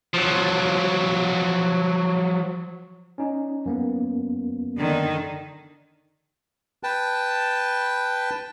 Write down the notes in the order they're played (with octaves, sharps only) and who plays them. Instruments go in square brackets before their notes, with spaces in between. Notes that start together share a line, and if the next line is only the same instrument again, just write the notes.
[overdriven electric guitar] F3 F#3
[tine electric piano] C#4 D#4
F#2 A#3 B3
[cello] D3 D#3
[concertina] B4 G5 A5